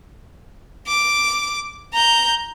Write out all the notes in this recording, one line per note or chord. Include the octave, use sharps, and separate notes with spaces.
D6
A#5 G6